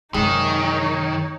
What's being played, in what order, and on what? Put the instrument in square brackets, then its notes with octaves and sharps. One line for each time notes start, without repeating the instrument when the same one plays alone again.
[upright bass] F#2 C3 [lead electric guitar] D#3 [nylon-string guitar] G#3 [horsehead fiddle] D#4 C#5